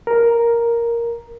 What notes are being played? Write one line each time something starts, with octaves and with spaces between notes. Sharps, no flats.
A#4